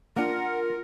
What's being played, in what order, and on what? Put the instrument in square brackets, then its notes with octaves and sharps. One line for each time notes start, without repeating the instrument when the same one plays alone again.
[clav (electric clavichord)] A#3 D4 [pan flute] F4 [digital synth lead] A#4 [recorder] F#5